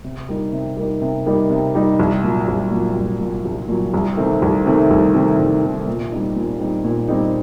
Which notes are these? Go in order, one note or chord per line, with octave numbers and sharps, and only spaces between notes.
C3
G3 A#3 D#4
C3
G3 A#3 D#4
C3
G3 A#3 D#4
C3
G3 A#3 D#4
C2
A#2 F#3
C2
A#2 F#3
C2
A#2 F#3
C2
A#2 F#3
C2
C3 D#3 A3 C4
C2
C3 D#3 A3 C4
C2
C3 D#3 A3 C4
C2
C3 D#3 A3 C4
A#2
G3 C4 D#4
A#2
G3 C4 D#4
A#2
G3 C4 D#4